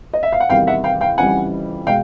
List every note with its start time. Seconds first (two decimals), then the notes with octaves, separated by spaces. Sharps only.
0.14 D#5
0.23 E5
0.32 F5
0.40 F#5
0.49 E2 C3 D#3 G3 F5 G5
0.67 E5 F#5
0.84 F5 G5
1.01 F5 G5
1.18 F2 C#3 E3 G3 F#5 G#5
1.87 B2 G#3 F5 G5